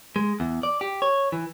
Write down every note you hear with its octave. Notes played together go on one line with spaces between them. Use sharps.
G#3
E2
D5
G4
C#5
E3